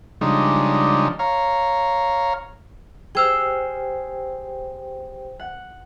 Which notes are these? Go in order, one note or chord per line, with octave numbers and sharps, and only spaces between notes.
C#3 F3 G3 G#3 D4 D#4
C#5 F5 A#5
G4 G#4 C5 G5 E6 F6
F#5